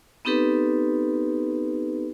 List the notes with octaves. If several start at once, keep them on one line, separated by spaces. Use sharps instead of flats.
B3 C4 D#4 G4 A4 B4